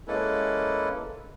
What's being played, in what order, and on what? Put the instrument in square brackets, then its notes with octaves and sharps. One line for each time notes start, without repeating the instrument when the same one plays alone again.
[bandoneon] G#3 A#3 C#4 E4 A4 B4